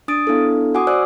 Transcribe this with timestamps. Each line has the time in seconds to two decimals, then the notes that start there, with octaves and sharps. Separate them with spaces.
0.08 D4 D#6 A6 D7
0.27 B3 D4 E4 A4
0.74 F#4 F#5 G#5 D6 D#6
0.87 C5 D5 G#5 E6 F#6